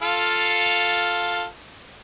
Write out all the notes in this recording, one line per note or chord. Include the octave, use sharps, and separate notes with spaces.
F4 A4 F5